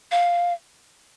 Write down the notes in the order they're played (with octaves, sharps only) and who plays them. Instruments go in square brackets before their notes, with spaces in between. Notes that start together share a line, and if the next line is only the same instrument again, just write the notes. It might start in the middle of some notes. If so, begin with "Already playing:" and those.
[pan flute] F5